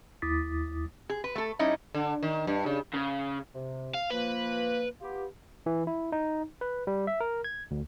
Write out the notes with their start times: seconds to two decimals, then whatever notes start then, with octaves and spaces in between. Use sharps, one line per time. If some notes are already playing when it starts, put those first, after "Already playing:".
0.22 D#2 E4 D6 D#6 A6 B6
1.10 G#4
1.24 B4
1.35 A3 A4
1.59 G3 C#4 D#4 E4
1.94 D3
2.23 D#3
2.47 G2
2.66 C#3
2.94 C#3
3.53 C3
3.94 F5
4.10 F3 A#3 B4
5.00 B3 F4 G4
5.66 E3
5.87 E4
6.12 D#4
6.61 B4
6.87 G3
7.07 E5
7.21 A#4
7.44 G#6
7.71 D2